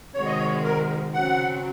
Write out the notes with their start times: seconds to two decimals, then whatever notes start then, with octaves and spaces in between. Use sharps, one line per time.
0.14 C3 D#3 G#3 C4 F#4 C#5
0.26 D#5
0.38 C#5
0.64 A#4
1.14 C#3 F#3 C4 F#5